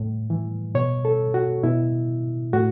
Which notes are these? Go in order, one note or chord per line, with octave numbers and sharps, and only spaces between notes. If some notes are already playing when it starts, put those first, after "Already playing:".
Already playing: A2
E3
B2 C#5
A4
F#4
B2 E4
A2 F#4